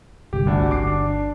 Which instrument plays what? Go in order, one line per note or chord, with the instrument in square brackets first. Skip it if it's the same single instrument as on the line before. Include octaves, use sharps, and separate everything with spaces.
[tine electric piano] G1 C2 [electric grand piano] G4
[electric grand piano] D2 D4 F#4
[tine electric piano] G1 [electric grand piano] D6 C7
[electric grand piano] D4